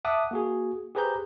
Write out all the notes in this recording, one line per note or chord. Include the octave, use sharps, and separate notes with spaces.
E5 F#5 A5 D6 D#6 F#6
A#3 F#4 G#4
G4 G#4 B4 C5 A#5 G6